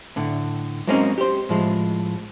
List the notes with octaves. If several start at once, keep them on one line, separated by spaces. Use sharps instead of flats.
A2 D3
F#3 G#3 A#3 C4 C#4 D#4
G4 C5
A2 F3 G#3